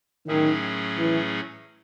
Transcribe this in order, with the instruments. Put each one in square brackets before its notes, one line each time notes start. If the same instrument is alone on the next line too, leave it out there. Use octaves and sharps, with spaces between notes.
[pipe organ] A2 F#3 A3 C#4 G#4 [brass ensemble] D#3
[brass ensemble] E3